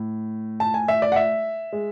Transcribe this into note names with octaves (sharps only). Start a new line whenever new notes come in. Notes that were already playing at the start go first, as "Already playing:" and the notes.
Already playing: A2
A5
G#5
E5
D5
F#5
E5
G#3